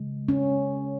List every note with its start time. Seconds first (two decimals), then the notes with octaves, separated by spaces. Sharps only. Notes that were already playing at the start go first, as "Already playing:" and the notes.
Already playing: C#3 G#3
0.28 C#4